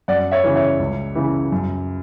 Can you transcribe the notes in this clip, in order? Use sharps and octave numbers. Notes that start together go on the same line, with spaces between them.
F#2 D5 F#5
C#5 E5
C#3 E3
C#5 E5
C#2
C#3 E3
F#2